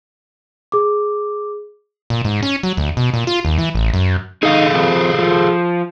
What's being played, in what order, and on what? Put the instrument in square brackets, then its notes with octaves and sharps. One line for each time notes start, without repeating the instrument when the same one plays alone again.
[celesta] G#4 D6
[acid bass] A#2
G#2
C#4
F#3
D2
B2
A#2
F4
D#2
E3
A1
F#2
[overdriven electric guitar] D#4 [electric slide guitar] G#4 A4 F5
[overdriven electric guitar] F2
F3